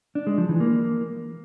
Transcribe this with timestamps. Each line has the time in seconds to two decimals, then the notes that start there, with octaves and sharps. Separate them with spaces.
0.15 D4
0.27 G#3
0.38 F3
0.49 E3
0.60 A#3